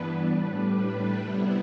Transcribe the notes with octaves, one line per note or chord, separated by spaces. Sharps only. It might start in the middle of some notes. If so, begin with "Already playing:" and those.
Already playing: G2 E3 B3 D4 B4
A2 G3 D4 B4
C3 G3 B3 E4